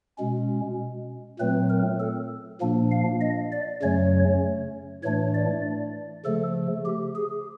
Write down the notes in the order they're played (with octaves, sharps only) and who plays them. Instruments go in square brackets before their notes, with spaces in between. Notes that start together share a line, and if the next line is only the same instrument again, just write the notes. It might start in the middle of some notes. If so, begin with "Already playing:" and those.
[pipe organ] B2 G#3 C#4
A#2 F#3 A3 C4 B4
A#4
A4
A#2 F3 A#3 D4
F5
D#5
D5
F#2 C#3 F#3 A3 C#4 C#5
A2 E3 A3 D4 C#5
D5
C#3 F3 A3 A4
G4
G#4